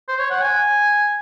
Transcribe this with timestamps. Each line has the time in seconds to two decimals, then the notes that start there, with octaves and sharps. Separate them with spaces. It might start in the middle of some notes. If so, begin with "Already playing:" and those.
0.08 C5
0.19 C#5
0.30 F#5
0.41 G#5